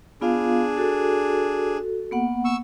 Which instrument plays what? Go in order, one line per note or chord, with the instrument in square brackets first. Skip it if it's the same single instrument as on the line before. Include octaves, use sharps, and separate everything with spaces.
[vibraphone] B3 F4 F5 [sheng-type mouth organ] D4 G#4
[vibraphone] F#4 A4
A#3 B3 F#5
[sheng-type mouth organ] C#6 E6